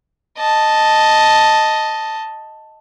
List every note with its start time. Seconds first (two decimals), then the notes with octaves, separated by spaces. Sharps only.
0.38 D#5 A5